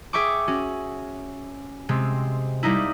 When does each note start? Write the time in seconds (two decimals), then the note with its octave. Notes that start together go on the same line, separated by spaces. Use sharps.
0.13 G#4 E5 G5 C#6 D6
0.48 C#4 F#4
1.89 C3 G#3 C4
2.63 G3 A#3 D#4 E4